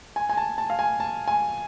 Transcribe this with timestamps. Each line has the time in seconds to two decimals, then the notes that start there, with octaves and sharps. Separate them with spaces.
0.16 G#5
0.29 G#5
0.37 A5
0.58 A5
0.70 F5
0.79 G#5
1.00 A5
1.28 G#5